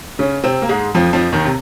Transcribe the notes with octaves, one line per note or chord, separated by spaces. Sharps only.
C#3 C#4
C3 C4
A#3
G#2 G#3
F2 F3
F2 F3
D#2 D#3
C3